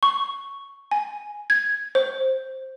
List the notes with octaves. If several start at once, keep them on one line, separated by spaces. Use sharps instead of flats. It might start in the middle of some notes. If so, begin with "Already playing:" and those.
C#6
G#5
G#6
C5